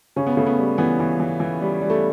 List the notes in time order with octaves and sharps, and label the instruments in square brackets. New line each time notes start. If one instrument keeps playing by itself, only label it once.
[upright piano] C#3 C#4
B3
C#3 A3
B3
G3
E3 B3
E3
E3
E3
G3
G3
A3